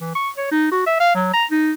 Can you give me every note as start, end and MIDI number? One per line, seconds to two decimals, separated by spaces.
0.01 0.10 52
0.15 0.30 85
0.37 0.46 73
0.51 0.71 63
0.72 0.82 66
0.86 1.00 76
1.00 1.14 77
1.15 1.30 54
1.34 1.45 82
1.51 1.72 63